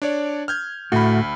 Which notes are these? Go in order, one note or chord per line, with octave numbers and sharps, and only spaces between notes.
D4 C#5 D5
F6 G6 G#6
D2 A2 A3 F#4 B5